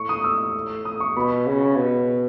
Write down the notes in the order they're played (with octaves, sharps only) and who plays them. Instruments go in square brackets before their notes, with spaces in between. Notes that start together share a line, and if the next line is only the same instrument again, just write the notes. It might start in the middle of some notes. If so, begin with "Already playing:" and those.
Already playing: [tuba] A2 [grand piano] C#6
[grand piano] D#6
E6
D#6
C#6
[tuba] B2 [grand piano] B5
[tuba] C#3
B2